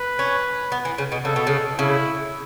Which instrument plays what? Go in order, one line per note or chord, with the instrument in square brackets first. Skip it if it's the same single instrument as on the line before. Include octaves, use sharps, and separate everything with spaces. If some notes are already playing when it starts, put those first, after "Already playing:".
Already playing: [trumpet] B4
[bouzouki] C#4
B3
E3
C#3
B2
[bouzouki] C#3 [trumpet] A4
[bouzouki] B2
C#3
[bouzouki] C#3 [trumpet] E4